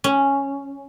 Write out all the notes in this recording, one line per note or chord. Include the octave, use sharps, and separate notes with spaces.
C#4